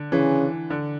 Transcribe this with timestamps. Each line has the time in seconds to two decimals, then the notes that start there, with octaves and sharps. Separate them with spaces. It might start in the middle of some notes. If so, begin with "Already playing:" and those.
Already playing: D3
0.12 C#3 E3
0.70 D3